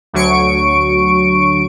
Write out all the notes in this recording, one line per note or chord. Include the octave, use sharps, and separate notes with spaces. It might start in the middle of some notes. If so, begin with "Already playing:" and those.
D2 F#3 C#6 D7